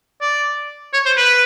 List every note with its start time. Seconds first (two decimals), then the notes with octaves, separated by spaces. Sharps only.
0.21 D5
0.93 C#5
1.05 C5
1.17 B4